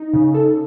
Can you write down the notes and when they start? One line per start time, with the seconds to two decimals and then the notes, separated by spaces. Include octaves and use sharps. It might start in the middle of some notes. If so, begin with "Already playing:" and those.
Already playing: D#4
0.13 C#3
0.34 A4